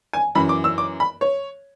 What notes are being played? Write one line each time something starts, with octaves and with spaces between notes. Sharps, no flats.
G#5
F#2 E3 B5
D6
E6
D6
B5
C#5